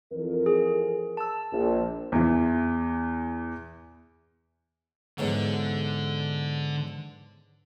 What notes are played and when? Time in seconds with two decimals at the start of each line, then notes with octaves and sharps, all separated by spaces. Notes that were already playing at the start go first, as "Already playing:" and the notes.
0.12 F2 E3 A#4
0.46 G#4
1.17 A5 E6
1.52 A#1
2.12 E2 E3
5.18 E2 G#2 D3 F#3